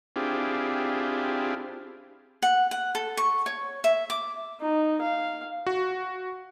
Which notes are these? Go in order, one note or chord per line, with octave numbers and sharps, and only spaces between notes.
C4 D4 E4 F4 G4 G#4
F#5
F#5
A4
C#6
C#5
E5
D6
D#4
F5
F#4